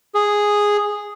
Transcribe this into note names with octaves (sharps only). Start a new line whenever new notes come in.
G#4